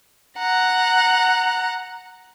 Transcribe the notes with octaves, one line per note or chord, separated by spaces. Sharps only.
F#5 A#5